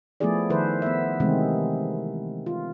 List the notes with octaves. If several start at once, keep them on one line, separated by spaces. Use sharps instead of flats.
F3 A3 B3 E4 G#4 D5
D#3 F3 E4 A4 B4 C5
B3 E5
C3 D#3 E3 G#3 A3 C4
F4